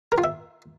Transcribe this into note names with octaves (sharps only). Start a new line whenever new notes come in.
A#4
F4
E5